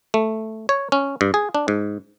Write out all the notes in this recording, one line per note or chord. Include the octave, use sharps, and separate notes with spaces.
A3
C#5
C#4
G2
G#4
D4
G#2